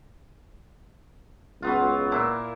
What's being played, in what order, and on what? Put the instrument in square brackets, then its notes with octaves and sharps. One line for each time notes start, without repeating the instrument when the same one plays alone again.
[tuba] C#2 [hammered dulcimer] F#3 B3 F4
[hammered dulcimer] A#2 A#3 E4